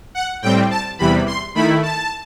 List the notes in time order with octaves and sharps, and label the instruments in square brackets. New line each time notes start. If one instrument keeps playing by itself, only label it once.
[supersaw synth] F#5
A2 G3 C4 G5
A5
E2 C3 E3 G3 B5
C6
D#3 A3 E4 B5
A5